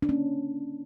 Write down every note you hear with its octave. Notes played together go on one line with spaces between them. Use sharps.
D4
A#3 C#4